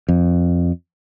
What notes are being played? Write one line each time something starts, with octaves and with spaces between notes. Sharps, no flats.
F2